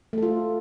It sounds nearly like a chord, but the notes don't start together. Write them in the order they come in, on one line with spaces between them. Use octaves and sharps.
A3 A4 F4